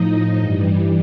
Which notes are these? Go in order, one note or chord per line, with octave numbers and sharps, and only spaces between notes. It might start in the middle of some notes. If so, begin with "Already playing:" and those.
Already playing: A2 F3 D#4 D#5
G2 E3 G3